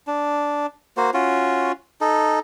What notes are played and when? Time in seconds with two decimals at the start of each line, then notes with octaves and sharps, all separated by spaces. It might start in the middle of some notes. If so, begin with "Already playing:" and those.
0.07 D4
0.97 A#3 F#4 C5
1.14 C#4 F4 F#4
2.01 D#4 A4